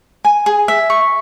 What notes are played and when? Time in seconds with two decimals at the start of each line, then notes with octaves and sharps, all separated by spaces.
0.25 G#5
0.46 G#4
0.68 E5
0.90 C#6